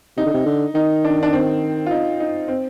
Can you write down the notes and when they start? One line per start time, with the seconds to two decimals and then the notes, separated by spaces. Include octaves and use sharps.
0.17 C3 D#4
0.26 D3
0.34 C3
0.46 D3
0.74 D#3 D#4
1.04 D4
1.23 D4
1.33 C4
1.86 F4
1.91 D#4
2.20 D#4
2.48 C4